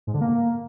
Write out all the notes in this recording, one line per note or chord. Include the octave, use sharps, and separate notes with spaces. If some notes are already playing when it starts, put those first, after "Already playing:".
G#2
D3
A#3